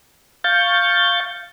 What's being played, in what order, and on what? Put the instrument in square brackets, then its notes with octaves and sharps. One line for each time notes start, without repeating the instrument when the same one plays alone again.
[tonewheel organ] F5 C#6 G6 A6